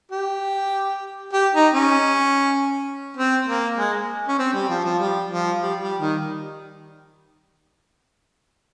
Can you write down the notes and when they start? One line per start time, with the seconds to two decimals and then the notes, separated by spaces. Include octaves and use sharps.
0.12 G4
1.33 G4
1.54 D#4
1.74 C#4
3.17 C4
3.47 A#3
3.78 G#3
4.28 C#4
4.38 C4
4.53 G3
4.69 F3
4.84 F3
5.00 G3
5.30 F3
5.61 G3
5.81 G3
6.01 D#3